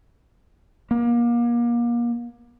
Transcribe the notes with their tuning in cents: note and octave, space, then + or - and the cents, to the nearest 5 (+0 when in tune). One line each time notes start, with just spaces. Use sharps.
A#3 +30